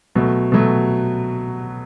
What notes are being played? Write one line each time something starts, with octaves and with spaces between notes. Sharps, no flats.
B2 F#3 A3
B2 F#3 A3